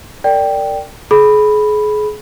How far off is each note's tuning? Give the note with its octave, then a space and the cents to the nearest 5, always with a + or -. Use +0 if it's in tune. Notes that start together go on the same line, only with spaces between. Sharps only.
A#4 -35 D5 +0 G5 +0
G#4 +35 B5 +0